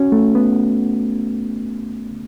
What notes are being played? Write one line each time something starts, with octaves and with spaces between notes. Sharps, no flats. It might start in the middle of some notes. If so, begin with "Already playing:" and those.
Already playing: C#4 F#4
A3
B3